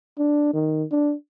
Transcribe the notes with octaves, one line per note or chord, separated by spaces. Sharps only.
D4
D#3
D4